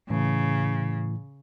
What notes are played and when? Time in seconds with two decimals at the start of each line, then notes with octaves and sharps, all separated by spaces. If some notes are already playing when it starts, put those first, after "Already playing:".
0.10 A2 C#3 E3